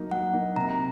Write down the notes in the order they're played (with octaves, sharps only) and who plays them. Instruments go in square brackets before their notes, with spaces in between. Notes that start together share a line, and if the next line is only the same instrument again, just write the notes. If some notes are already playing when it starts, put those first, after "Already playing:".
Already playing: [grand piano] F#3 A#3 D#4
[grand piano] F#3 [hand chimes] F#5
[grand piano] A#3 D#4
[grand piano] C3 [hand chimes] A#5